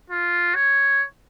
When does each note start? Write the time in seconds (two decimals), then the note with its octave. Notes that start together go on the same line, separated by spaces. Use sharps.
0.10 F4
0.55 C#5